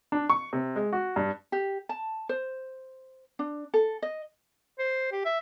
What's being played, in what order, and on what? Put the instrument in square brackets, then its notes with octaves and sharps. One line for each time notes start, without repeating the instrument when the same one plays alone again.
[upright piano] D4
C#6
C3
G#3
F#4
G2
[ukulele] G4
A5
C5
D4
A4
D#5
[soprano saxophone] C5
G4
E5